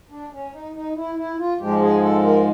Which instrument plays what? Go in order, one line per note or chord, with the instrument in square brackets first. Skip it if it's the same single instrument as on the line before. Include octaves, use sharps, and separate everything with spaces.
[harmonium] D4
C#4
D#4
D#4
E4
E4
F4
G#2 F3 G#3 G4
G#4
A4
A#4